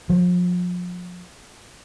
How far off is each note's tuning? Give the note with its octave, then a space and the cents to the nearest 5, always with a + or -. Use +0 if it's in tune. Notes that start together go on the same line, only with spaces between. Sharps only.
F3 +35